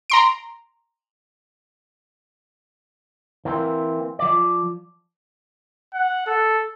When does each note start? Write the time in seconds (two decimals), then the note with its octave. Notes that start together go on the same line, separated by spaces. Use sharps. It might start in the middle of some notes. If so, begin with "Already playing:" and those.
0.10 A#5 C6 D7
3.45 E3 A#3 C4
4.19 F3 D5
5.93 F#5
6.26 A4